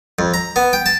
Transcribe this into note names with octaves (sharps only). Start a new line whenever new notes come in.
F2
A#5
B3
G5
A5